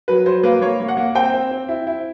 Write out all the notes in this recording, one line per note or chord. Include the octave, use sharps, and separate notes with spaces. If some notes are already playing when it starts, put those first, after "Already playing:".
F#3 B4
F#3 C5
A#3 B4
A#3 C#5
A#3
F#5
A#3
C4 G5
C4
C4
E4
E4